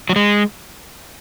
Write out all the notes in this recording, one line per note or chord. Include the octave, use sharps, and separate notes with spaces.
F#3
G#3